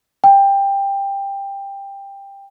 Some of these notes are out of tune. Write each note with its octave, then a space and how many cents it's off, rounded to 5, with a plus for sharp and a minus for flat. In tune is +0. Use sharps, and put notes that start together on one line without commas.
G5 +15